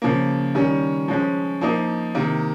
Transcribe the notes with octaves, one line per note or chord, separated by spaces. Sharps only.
C#3 F3 A#3
D#3 G3 C#4
F3 G#3 C#4
F3 A#3 D#4
C3 D#3 A#3